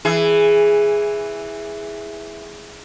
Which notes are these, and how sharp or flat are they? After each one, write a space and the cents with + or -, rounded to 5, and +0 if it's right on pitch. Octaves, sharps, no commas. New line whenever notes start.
E3 +0 G#4 +0